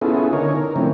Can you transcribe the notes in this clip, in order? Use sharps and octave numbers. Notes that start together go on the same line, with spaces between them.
B3 C#4 E4 F4 G#4 A4
D3 D#4 A#4 C#5
A#4
D3 E3 F3 A3 C4 C#4